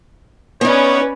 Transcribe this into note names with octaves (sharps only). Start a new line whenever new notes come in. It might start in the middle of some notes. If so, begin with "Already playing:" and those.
B3 C#4 D#4 B4 C#5 D5